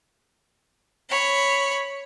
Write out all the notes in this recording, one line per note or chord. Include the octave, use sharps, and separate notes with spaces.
C#5 B5